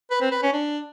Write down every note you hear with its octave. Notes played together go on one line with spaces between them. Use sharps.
B4
C4
B4
C#4
D4